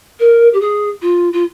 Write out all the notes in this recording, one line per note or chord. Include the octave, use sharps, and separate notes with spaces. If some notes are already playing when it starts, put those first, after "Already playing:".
A#4
G4
G#4
F4
F4